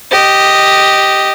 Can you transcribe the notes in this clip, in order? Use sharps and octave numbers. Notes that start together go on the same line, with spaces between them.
G4 D#5